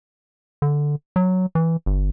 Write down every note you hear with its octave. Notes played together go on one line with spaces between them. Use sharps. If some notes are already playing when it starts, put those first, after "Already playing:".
D3
F#3
E3
G1